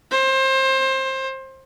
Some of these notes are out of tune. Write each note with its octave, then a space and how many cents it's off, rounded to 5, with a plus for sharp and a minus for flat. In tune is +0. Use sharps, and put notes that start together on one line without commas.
C5 +25